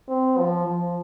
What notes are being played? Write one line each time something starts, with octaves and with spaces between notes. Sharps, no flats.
C4
F3
F3